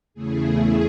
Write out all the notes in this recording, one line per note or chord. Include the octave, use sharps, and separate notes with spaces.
E2 C#3 E3 A3 G#4
G#4